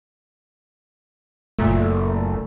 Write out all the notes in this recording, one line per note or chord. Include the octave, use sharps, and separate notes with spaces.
F#1 A#2 A3